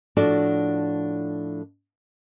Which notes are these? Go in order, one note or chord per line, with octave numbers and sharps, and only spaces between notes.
A2 F3 D4 F#4 A4 D5